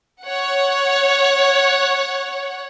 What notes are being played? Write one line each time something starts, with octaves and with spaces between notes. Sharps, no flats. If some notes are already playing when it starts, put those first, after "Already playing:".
C#5 F#5